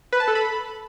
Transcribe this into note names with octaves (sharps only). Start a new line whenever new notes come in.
B4
A5
A4
B5